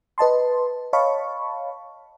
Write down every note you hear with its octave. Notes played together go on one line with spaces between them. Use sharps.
B4 D#5 A5 C6
C#5 D#5 F5 A5 B5 C#6